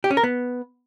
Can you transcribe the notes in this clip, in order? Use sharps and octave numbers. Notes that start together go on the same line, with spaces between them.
G4
C#4
A#4
B3